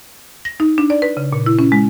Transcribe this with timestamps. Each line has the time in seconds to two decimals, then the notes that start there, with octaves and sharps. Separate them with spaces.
0.45 A#6
0.60 D#4
0.78 D4
0.90 D5
1.02 B4
1.17 C#3
1.33 A#2
1.46 E4
1.59 C#4
1.72 G#3